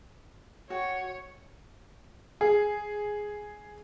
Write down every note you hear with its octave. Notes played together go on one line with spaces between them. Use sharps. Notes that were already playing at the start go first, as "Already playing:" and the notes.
F#4 C#5 G5
G#4